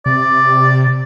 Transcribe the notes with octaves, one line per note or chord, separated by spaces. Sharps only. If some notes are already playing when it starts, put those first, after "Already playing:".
C3 D5